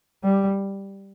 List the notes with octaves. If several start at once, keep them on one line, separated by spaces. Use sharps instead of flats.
G3